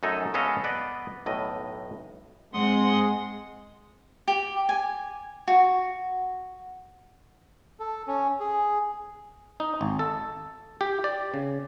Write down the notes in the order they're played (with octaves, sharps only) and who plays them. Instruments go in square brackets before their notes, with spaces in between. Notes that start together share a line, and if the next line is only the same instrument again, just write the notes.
[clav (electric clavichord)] F#2 A3 D#4 A4 G#5
G#3 B3 C#4 A4 D#5 F5
B3 B4 D5 D#5
B1 A2 D#5
[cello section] G#2 C4 [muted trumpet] G#3 [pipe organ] F#5 C6 D#6
[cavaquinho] G4
G#5
F#4
[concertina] A4
C#4
G#4
[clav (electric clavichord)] D#4
G#1
A4
G4
D5
C#3